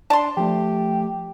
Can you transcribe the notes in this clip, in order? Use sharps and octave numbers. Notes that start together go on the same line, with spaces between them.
D4 A5 C6
F3 A3 G4